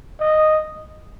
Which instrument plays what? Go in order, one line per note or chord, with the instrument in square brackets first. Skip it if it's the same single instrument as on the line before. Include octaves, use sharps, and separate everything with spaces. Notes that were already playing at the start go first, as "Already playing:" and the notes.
[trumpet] D#5